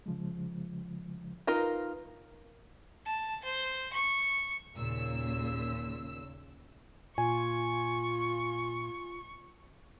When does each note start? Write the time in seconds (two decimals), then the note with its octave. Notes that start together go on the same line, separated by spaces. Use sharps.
0.06 C#3 F3 G#3
1.47 D#4 F4 A#4 B4
3.05 A5
3.44 C5
3.93 C#6
4.75 D#2 A#2 C#3 E6
7.18 A#2 F4 G#5 C#6